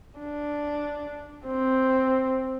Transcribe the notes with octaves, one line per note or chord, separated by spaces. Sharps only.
D4
C4